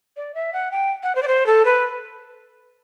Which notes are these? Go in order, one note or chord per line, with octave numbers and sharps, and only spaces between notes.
D5
E5
F#5
G5
F#5
C5
D5
C5
A4
B4